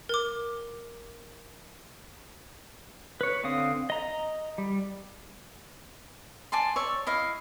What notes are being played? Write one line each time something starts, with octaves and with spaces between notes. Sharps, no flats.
A#4 D6
B4 C#5
D3 C4 F5 D#6
D#5 A#5
G3
D5 G#5 A5 C6
C#5 D5 E5
E4 D#5 F5